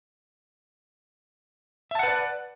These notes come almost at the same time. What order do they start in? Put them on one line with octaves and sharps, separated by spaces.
E5 A5 F#5 B4 D5